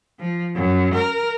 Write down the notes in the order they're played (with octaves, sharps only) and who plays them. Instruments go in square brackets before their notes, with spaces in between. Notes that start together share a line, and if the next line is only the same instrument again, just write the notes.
[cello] F3
F#2
A#4